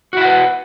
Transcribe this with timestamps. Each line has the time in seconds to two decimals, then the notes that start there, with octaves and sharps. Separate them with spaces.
0.13 F#4
0.17 E4
0.21 F#5
0.25 B4